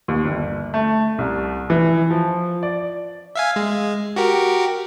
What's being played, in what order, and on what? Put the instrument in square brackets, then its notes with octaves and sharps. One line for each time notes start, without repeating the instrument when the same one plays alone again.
[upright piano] D#2
G1
A3
C2
E3
F3
D5
[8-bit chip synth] E5 F5 G#5
G#3
F#4 G4 A#4